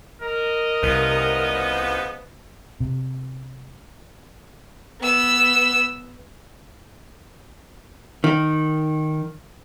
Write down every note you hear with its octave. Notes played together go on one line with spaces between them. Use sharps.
A#4 D#5
C2 C#3 F3 B3
C3
B3 E6
D#3